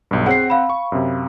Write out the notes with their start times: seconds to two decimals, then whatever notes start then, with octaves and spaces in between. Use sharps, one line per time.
0.11 B1 G2
0.26 C4 G#4 C#5 F#5 C7
0.50 F5 B5
0.69 C#6
0.92 F#2 C3